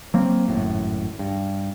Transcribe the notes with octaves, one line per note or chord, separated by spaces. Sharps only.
F#3 A#3 C4
G#1 F#2 A2
G2